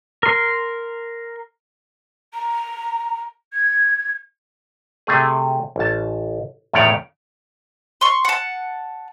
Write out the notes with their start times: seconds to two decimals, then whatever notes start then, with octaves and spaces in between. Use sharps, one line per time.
0.23 A#4 C6
2.33 A#5
3.52 G#6
5.07 C3 A3 G#4
5.76 A1 A5
6.73 E2 A2 D#3 A3 C#5 D5
8.01 C6 C#6
8.25 F#5 A5